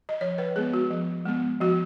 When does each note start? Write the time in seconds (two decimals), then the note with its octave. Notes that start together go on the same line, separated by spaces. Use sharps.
0.09 D#5
0.21 F3 C#5
0.38 B4
0.56 G#3 B3 G#4
0.74 F#4
0.91 F3
1.25 G#3 B3
1.61 F3 F#4